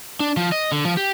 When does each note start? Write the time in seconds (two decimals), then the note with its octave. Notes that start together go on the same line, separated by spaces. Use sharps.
0.20 D4
0.37 F3
0.52 D#5
0.72 D3
0.85 F3
0.97 G4